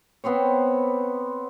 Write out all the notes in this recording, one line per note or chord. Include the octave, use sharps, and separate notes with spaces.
B3 C4 C5 C#5